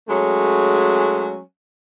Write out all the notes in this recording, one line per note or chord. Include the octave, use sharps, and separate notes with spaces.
F#3 G#3 A3 C#4